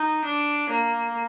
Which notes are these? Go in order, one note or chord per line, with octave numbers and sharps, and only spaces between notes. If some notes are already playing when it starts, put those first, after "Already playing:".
Already playing: D#4
D4
A#3